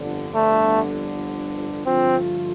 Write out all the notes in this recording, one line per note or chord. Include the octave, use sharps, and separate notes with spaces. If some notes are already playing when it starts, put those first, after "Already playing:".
Already playing: G1 F2 D3
A3
G2 D3 F3 A3 C4 F4